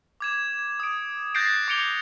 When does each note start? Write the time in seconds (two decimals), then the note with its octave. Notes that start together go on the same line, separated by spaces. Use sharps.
0.20 D6 G#6 E7
0.59 G#6
0.80 D#6 D7
1.35 F#6 G6 A6 A#6 C7 D7
1.68 D6 G#6 C#7 D7 F7 G7